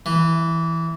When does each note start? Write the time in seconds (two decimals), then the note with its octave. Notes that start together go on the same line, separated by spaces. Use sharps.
0.06 E3